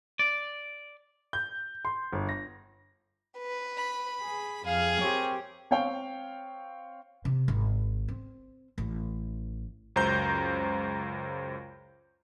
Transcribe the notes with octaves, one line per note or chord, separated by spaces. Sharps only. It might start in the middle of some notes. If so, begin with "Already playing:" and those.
D5
G6
C6
G1
A#6
B4
B5
G#4
F2 G#4 F5
C4 G4 A#4 C#5
C4 C#5 F5 G5
C3
G#1
C4
A1
C#2 F#2 C5 A#5 G6